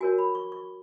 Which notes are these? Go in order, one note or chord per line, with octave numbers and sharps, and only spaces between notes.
F#4 A#4 C#5 G#5
B5
C#6
C#6